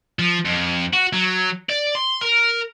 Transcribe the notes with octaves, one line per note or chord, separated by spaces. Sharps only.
F3
F2
F#4
F#3
D5
C6
A#4